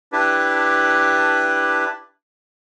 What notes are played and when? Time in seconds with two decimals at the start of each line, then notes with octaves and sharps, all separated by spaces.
0.12 D4 E4 G4 B4